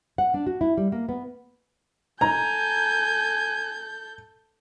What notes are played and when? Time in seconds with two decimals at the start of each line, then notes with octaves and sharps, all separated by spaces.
0.18 F#5
0.34 D4
0.46 F#4
0.61 E4
0.77 G3
0.92 A#3
1.09 B3
2.21 A4 G#5 A#5 G6